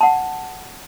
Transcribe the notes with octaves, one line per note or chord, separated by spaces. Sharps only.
F#5 A5